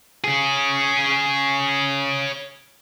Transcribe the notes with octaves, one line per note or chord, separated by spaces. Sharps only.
C#4 G#4